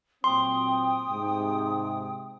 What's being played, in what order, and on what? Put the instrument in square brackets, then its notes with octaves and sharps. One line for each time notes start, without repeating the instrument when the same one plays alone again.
[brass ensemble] A#2 F#3 C4 [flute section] G5 D#6 [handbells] C6
[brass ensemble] G#2 C3